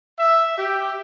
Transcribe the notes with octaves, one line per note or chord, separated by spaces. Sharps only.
E5
G4